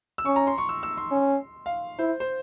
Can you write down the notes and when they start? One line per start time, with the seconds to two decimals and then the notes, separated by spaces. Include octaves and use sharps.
0.18 E6
0.25 C#4 C#6
0.36 A#5
0.47 C6
0.58 C#6
0.69 E6
0.83 E6
0.97 C6
1.11 C#4
1.66 F5
1.99 E4 C5
2.20 C5